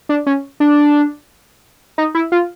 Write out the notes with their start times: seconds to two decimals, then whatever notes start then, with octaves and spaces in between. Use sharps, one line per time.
0.09 D4
0.26 C#4
0.60 D4
1.98 D#4
2.15 E4
2.32 F4